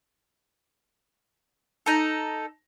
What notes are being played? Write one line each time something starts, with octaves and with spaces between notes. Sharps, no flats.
D#4 A4